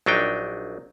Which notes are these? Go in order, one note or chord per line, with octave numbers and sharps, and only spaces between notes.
A#1 F#3 D4 D#4 G5